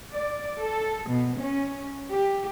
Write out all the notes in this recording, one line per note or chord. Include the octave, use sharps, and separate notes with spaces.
D5
A4
B2
C#4
G4